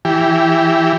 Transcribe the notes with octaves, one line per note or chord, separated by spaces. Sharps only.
E3 G4